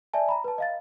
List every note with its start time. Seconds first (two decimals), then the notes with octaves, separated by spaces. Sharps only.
0.13 D5 E5 G#5 A5
0.29 A#5 B5
0.44 B4 A5
0.58 D#5 F5 A6